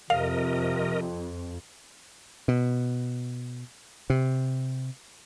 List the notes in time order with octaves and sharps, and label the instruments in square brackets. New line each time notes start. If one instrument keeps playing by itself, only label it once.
[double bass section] F2 [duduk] C3 [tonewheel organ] A#4 D#5 [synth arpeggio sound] F5
[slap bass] B2
C3